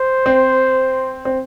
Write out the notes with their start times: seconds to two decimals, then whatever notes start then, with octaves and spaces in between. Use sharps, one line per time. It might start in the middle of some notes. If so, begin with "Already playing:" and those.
Already playing: C5
0.26 C4
1.25 C4